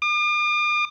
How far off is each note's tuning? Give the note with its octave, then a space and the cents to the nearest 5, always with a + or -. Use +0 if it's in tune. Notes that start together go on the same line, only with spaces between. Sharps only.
D6 +45